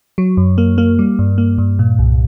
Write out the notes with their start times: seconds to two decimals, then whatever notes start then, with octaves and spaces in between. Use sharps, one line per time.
0.18 F#3
0.37 F#2
0.58 A#3
0.78 A#3
0.99 G3
1.19 G2
1.38 A#3
1.58 G2
1.79 A#2
1.99 C2